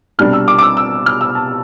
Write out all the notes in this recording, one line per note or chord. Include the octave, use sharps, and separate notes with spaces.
C2 B2 G3 D4 F6
E6
D6
D6
E6
E6
F6
E6
A5